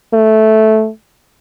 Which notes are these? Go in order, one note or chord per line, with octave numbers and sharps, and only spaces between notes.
A3